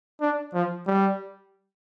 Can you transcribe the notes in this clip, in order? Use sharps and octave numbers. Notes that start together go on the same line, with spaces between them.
D4
F3
G3